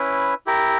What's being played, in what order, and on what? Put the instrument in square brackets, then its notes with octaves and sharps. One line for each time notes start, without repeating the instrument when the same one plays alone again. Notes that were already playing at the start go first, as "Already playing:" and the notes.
Already playing: [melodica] C#4 E4 B4
E4 G4 A#4